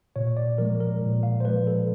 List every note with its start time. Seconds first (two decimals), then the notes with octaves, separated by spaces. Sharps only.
0.16 A#2 C#5
0.37 D5
0.58 F3 G#3 A#4
0.80 A#4
1.02 A#2
1.23 F5
1.40 C5
1.45 F3 G#3 B4
1.67 A4